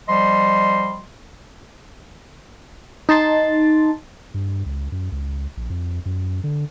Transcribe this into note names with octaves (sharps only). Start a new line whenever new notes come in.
F3 G3 D#5 C6
D#4 A5 C6 A6
G2
C#2
F#2
C#2
A#1
F2
F#2
D3